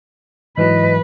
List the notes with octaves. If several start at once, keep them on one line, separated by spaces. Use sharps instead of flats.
G#2 E3 F#3 B4 D#5